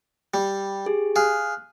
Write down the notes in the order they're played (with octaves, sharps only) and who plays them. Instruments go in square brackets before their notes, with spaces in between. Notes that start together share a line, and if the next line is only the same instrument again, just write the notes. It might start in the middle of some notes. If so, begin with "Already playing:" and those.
[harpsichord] G3
[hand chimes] G4 G#4
[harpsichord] G#4 [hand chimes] F5 F6 F#6